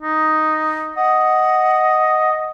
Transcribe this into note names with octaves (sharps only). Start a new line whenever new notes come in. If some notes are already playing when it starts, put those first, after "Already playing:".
D#4
D#5 F#5